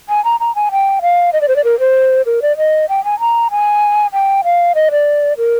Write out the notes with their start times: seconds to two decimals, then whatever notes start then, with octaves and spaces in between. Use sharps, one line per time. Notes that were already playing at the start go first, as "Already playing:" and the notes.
0.09 G#5
0.25 A#5
0.40 A#5
0.55 G#5
0.72 G5
1.02 F5
1.33 D#5
1.41 D5
1.48 C5
1.56 D5
1.64 A#4
1.80 C5
2.26 A#4
2.42 D5
2.58 D#5
2.89 G5
3.05 G#5
3.20 A#5
3.51 G#5
4.13 G5
4.44 F5
4.75 D#5
4.91 D5
5.38 A#4